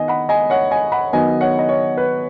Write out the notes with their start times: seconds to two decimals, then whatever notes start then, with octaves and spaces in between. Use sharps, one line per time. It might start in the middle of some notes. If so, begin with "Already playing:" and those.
Already playing: D#3 B3 D#5 G#5
0.08 F#5 B5
0.29 D#5 G#5
0.50 C#5 F#5
0.71 D#5 G#5
0.92 F#5 B5
1.13 D#3 F#3 B3 D#5 G#5
1.41 C#5 F#5
1.59 D#5
1.69 C#5
1.98 B4